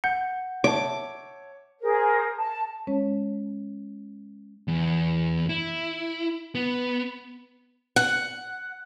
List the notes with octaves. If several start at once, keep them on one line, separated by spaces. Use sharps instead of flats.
F#5 G6
C#5 E5 A5 D6
G#4 A#4 C5
A5
G#3 C#4 C#5
E2
E4
B3
F#5